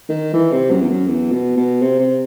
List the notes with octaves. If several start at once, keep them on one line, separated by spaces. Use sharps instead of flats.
D#3
E3
C3
F#2
E2
F#2
E2
B2
B2
C3
C3